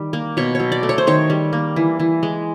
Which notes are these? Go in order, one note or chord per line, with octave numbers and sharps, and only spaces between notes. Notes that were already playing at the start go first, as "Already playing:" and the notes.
Already playing: D#3 G3
A#3
B2 C#5
F#3 C#5
D5
A3
C#5
C5
D#3 C#5
G3
A#3
E3
E3
G#3